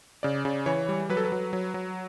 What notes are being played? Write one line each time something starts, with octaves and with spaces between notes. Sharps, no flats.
C#3 D5
C#3
E3 C#5
G3
F#3 B4
A4
B4
F#3
F#3
F#3